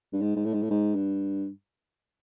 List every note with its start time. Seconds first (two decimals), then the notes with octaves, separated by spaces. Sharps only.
0.13 G2
0.21 G#2
0.36 G#2
0.45 A2
0.53 G#2
0.62 A2
0.70 G#2
0.95 G2